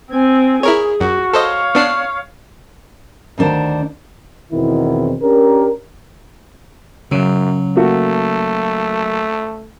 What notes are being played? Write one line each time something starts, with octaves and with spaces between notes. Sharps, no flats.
C4 G#5
E4 G#4 A#4 C#5
F#2 F#4
A4 C5 C#5 D#5 F5
B3 D4 C7
D2 D#3 D4 C5 F#5
E2 B2 D#3 B3 C4 E4
C#4 D4 G4 A#4
F#2 C#3 F#3
A3 A#3 F#4